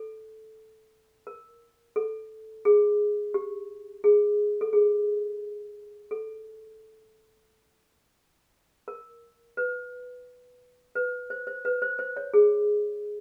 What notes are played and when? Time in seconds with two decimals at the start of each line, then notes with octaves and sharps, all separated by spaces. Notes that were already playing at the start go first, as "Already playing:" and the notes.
Already playing: A4
1.27 A#4
1.96 A4
2.65 G#4
3.34 G4
4.04 G#4
4.61 A4
4.73 G#4
6.11 A4
8.88 A#4
9.57 B4
10.95 B4
11.30 C5
11.47 C5
11.65 B4
11.82 C5
11.99 C5
12.17 C#5
12.34 G#4